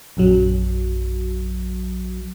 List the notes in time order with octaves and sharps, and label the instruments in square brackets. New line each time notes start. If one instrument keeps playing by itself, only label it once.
[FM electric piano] A#1 F#2 F#3